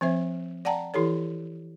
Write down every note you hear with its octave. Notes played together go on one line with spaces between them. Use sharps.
F3 C4 C5 E5
D5 F#5 G5 A5 A#5
E3 E4 G4 A4 C#5